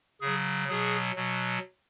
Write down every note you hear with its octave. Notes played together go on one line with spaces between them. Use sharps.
C#3 F#3 G#4
B2 F#3 G#4
B2 F#3